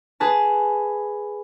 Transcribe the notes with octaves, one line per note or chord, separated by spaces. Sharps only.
G#4 B4 A5